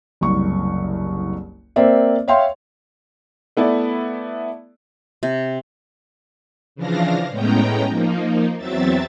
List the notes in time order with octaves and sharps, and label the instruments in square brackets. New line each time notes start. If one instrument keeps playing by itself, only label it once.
[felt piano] F#1 C2 C#6
A#3 C4 C5 D5 E5
C#5 E5 F5 G5 C6
[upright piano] A3 B3 E4 D5
[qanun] C3
[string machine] C#3 E3 F3 D4 F5 A#6
A2 G#3 B3 C#4 G5 A#5
F3 A#3 D#4
E2 F#3 C4 E5 A6